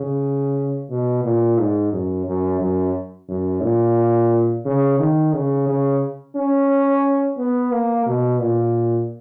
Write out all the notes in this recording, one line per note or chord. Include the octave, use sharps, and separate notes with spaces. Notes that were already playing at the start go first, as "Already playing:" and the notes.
Already playing: C#3
B2
A#2
G#2
F#2
F#2
F#2
F#2
A#2
C#3
D#3
C#3
C#3
C#4
B3
A#3
B2
A#2